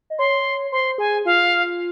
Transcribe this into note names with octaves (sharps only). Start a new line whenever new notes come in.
D#5
C#5 C6
C5 C6
G#4 G#5
F4 F5